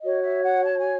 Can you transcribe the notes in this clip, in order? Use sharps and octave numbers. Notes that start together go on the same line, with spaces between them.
F#4 C#5 D#5
E5
F#5
A5
G#5